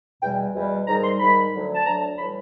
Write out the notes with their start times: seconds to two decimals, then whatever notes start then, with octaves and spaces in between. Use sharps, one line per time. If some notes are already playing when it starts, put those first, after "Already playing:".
0.22 E2 B2 G3 G5
0.55 E2 B2 G3
0.88 G#2 D#3 G3 A#5
1.04 C6
1.20 G#2 D#3 G3 B5
1.53 D2 D3 F#3
1.75 A5
1.86 D2 D3 F#3 A#5
2.02 A5
2.18 A2 E3 G3 B5